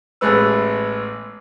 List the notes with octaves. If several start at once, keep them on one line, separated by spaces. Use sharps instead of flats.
A1 G#3 A3 B3 B4 E6